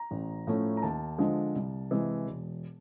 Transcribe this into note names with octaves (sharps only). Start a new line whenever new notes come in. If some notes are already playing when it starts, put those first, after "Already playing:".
Already playing: A#5
A1
A2 F3 A3 C#4
A#5
D#2 A5
D3 F3 G#3
C2
C3 E3 G#3
E1